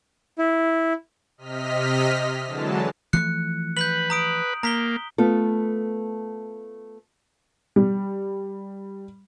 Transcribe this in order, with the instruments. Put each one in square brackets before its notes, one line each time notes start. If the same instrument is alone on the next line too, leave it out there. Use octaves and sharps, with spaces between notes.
[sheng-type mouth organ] E4
[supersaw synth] C3 D#5 F6 B6
D3 E3 F#3 G#3 A5
[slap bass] E3 F3 A3 [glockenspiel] F#6 C#7
[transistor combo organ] B4 [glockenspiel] G6 B6 F#7
[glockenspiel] A#5 D#6 D7
[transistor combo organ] A#3 [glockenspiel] A#5 B6 G7
[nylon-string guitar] A3 B3 F4 A4
[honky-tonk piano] G3